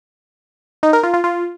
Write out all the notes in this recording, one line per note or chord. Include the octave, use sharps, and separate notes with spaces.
D#4
A#4
F4
F4
F4